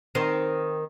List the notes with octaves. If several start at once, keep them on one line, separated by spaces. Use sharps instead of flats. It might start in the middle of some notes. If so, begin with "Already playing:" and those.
D#3 C4